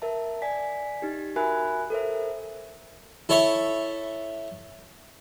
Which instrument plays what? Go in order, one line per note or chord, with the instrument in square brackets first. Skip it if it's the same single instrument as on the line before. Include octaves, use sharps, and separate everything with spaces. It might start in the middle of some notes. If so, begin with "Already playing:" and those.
[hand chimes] A#4 E5 A5
D5 G#5 B6
D#4 G4
F#4 A#4 E5 G#5 B5 F#6
A4 A#4 C5 E5
[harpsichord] E4 A4 C#5 E5